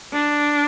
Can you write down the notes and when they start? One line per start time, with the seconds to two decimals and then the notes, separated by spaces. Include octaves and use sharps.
0.13 D4